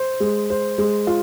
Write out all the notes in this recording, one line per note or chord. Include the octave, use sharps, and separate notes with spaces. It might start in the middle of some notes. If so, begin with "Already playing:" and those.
Already playing: C5
G#3
C5
G#3
F4